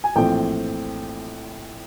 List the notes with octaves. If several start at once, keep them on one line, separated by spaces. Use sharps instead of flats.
G#5
A#1 A2 E3 A3 C4 G5